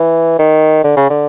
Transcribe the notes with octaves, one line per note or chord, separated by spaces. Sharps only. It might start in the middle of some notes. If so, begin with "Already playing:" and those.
Already playing: E3
D#3
D3
C#3
D3